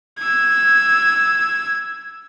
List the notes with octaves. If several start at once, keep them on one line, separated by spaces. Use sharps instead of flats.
E6 G#6